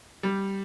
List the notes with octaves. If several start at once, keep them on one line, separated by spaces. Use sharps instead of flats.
G3